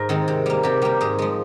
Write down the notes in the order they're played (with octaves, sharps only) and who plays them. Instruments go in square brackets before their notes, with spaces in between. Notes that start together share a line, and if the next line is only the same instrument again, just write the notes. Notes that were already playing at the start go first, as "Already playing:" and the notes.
Already playing: [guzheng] G#2 A#4
D#3 G#3 C4
C3
G3 A#3
C3 G4
G3 A#3 G4
G#2 G#4
F3 G#3